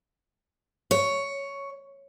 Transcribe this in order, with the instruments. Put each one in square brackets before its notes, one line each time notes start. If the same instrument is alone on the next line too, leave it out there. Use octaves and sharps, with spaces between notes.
[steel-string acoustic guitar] C#5